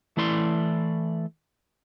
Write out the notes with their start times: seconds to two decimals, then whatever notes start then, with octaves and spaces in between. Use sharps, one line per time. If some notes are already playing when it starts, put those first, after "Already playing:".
0.17 E3 A3 E4 D5 C6